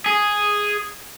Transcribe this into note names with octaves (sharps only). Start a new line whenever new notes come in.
G#4